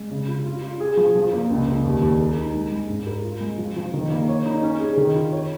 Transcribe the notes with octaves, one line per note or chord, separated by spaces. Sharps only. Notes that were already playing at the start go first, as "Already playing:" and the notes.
Already playing: G#3
C#3
F4
F4
F4
G#4
F3
F3
A#3
C#2
C#2
D#2
D#2
A#4
D#4
G#3
G#3
G#2
A#4
F4
G#3
F3
F3
D#3
A#3
C#5
D#4
C#4
G#4
D#3
F4
C#5